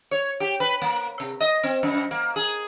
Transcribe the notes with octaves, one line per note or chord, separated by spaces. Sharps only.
C#5
G4
B4
A#3
C3
D#5
C4
F#2
A#3
G#4